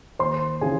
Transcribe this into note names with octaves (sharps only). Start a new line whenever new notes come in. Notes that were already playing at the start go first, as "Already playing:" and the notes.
D#2 C5 C6
C#3 E3 G#4 G#5